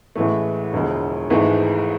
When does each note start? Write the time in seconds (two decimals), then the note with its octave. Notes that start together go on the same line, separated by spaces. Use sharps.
0.16 A1 A2 E3 G#3 A3
0.73 E1 D2 D3 F3 G#3
1.30 G#1 G#2 E3 G#3 A3